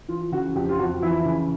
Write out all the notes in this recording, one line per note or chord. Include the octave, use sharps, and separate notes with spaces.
E3 F4
C#3 F#4
F2 G4
F4
F2 F#4
E3 E4
C#3